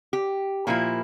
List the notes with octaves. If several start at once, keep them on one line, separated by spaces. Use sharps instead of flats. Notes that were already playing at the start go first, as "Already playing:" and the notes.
G4
A#2 F3 A#3 E4